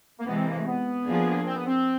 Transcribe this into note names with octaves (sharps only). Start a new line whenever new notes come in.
A#3
C3 E3 G#3 B3
C4
A#3
A3
B3
F3 A#3 D4 F4 G#4
C4
B3
C4